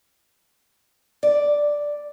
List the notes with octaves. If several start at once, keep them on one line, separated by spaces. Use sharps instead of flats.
D5